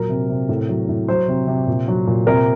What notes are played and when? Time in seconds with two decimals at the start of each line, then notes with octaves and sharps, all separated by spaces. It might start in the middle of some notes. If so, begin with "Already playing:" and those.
Already playing: A#2 F#3 A#4
0.09 C3
0.29 C3
0.49 A2
0.68 F#3
0.89 A2
1.08 F#3 C5
1.28 C3
1.47 C3
1.67 A#2
1.88 F#3
2.07 A#2
2.27 C3 A#4